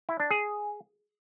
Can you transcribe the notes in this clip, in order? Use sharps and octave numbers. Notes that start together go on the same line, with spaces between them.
E4
D4
G#4